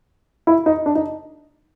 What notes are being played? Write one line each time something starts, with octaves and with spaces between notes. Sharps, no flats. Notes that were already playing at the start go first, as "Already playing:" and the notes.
E4
D#4
D4
D#4